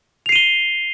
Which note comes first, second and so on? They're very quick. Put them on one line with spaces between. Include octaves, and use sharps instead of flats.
F7 C7 D#7 G7